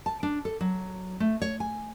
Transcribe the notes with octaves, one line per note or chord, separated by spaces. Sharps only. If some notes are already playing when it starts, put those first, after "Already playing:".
A5
D4
A4
F#3
A3
C#5
G#5